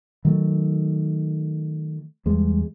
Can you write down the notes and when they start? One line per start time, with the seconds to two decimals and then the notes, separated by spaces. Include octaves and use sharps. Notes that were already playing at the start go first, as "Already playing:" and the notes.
0.25 D#3 F#3 A3
2.26 E2 G3 G#3